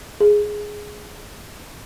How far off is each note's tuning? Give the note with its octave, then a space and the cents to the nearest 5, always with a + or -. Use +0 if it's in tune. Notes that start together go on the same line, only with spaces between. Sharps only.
G#4 +5